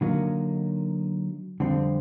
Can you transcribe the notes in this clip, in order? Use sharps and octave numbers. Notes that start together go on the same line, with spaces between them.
D3 F#3 A#3 D#4
F2 D3 G3 C4